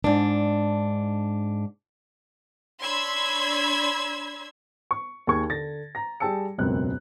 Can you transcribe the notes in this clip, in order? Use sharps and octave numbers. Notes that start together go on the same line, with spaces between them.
G#2 D4
D4 C#5 B5 C6 E6 G#6
C#6
D#2 G#4 C#6 G#6
D3 A6 A#6
A#5 A#6
G3 G#4 G5 A5 E6 C#7
E1 C#2 F#2 C4 F#6